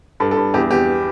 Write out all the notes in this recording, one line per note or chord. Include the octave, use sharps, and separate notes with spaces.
G2 A4
A4
G2
E2 G4
E2 G4